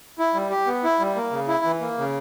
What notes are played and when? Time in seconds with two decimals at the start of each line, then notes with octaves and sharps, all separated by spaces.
0.19 E4
0.34 G3
0.50 G4
0.67 B3
0.84 E4
0.99 G3
1.16 A#3
1.32 C#3
1.48 E4
1.65 E3
1.81 A#3
1.98 C#3